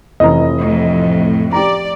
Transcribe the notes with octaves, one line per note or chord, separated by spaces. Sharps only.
F1 E3 D#5 A#5
F2 A2
G4 D5 A#5